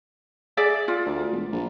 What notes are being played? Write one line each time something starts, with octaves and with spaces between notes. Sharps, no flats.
G#4 D5 E5
F4
D2
E1
A#1